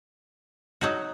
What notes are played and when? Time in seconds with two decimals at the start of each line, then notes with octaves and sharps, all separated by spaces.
0.81 F#3 D#4 F#4